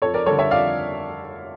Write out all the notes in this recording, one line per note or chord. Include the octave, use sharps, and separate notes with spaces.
F2 A4 C#5
A#4 D5
D3 G3 A4 C#5
C#5 E5
F2 D5 F5